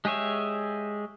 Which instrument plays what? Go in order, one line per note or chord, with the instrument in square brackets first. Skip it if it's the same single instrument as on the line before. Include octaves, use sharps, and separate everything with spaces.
[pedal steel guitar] G#3 G4 G#4 C#5 E5